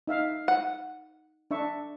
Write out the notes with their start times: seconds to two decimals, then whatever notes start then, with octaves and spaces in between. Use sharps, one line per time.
0.07 D#4 E5 F5
0.48 F#5
1.51 D4 E5 C#6